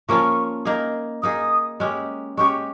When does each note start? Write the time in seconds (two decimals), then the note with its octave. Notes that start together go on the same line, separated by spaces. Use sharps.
0.09 F3 A#3 C#4 F4 C#6
0.65 A#3 D#4 G#4
1.22 A#3 D#4 G#4 D#6
1.80 G#3 C#4 G4
2.37 G#3 C#4 G4 C#6